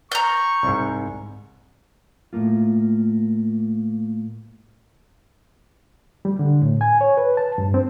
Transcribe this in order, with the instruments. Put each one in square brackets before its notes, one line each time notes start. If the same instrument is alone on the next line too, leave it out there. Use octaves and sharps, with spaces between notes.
[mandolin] A#5 G6 [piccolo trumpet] C#6
[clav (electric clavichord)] C2 G#2
[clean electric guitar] A2 A3 A#3 F4
[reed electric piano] G3
D3
A2
G#5
C#5
B4
A5
G2
C4